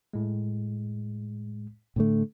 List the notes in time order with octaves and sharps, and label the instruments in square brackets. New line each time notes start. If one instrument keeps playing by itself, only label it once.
[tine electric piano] A2 G#3
[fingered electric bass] A2 D3 A3